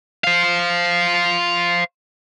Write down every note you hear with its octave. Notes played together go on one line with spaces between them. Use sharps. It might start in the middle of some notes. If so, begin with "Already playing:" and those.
C5 F5